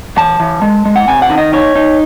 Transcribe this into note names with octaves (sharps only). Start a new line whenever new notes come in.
E3 A5
E3
G#3
G#3
F#5
C3 G#5
F#5
D#3
D#5
D#4 C#5
D#4